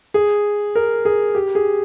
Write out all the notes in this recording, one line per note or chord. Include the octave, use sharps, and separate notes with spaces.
G#4
A#4
G#4
G4
G#4